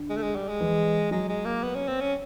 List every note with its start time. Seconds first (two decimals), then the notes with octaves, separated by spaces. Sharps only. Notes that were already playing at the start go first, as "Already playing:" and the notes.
Already playing: D3
0.10 G#3
0.17 A3
0.22 G#3
0.35 G3
0.49 G#3
0.61 E3
1.11 F#3 G#3
1.29 G#3
1.46 A#3
1.63 B3
1.75 C#4
1.87 C4
2.00 C#4